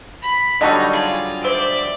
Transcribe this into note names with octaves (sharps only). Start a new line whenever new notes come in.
B5
D3 F#3 G3 D#4 D#5 A5 C#6
F4 G#4
C5 D5 E5